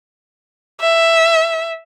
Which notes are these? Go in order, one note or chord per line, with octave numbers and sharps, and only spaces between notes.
E5